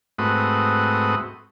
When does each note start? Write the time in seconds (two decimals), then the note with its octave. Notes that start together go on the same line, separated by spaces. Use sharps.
0.18 G#2 A3 C4 F#4 B4 D#6